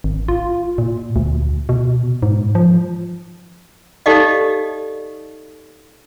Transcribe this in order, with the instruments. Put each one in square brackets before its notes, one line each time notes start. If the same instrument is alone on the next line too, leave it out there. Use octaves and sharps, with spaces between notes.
[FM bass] G#1
F4
A#2
D2
B2
G#2
F3
[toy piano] D#4 G4 A4 D5 D#5 F5